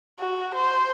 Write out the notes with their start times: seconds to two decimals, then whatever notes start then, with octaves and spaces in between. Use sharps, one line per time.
0.19 F#4
0.55 C5